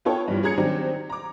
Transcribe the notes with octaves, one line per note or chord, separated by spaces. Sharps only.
B3 F4 A4 C#5 G5
G2 E3 F3 G3
C#4 G#4 A#5 G#6 C#7
D#3 F#3 C4 D4 G4
A#5 D6